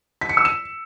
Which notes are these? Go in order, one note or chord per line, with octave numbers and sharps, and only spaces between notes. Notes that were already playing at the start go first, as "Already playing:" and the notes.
B6
C#7
E6
E7